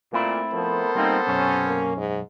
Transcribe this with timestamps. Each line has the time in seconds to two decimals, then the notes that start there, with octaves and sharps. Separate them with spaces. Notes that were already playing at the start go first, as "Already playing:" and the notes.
0.13 A#2 A3 C4 E4
0.53 F3 B3 A4 A#4 C5
0.95 G3 A#3 C4 D#4 F4
1.27 B1 F#2 C3 C#4
1.66 A#3
1.97 G#2